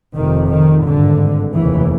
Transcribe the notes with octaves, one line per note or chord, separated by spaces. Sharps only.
F1 F2 C3 D#3
D#3
G#1 G2 D3
F1 D#2 C#3 E3